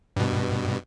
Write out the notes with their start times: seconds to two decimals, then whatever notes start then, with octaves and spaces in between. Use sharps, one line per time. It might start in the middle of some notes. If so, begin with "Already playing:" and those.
0.16 G2 B2